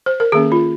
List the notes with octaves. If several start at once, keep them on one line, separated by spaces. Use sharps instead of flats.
C5
A#4
D#3 A#3 C#4 G#4
F4